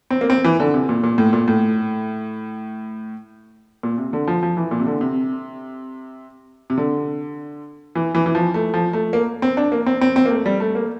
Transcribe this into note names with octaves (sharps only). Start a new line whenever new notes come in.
C4
A#3
C4
E3
D3
C3
A#2
A#2
A2
A#2
A2
A#2
C3
D3
F3
F3
E3
A#2
C3
D3
C3
C3
D3
E3
E3
E3
F3
A3
F3
A3
A#3
C4
D4
A#3
C4
C4
C4
A#3
A3
G3
A3
A#3